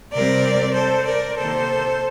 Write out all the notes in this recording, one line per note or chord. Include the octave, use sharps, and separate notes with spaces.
C3 G3 C4 A#4 D5
A4 C5
A#4 D5
C3 D#3 A#3 A4 C5